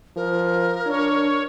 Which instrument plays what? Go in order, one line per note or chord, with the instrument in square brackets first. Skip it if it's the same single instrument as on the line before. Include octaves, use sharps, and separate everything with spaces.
[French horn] F3 [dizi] A#4
[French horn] D4 [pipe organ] C#5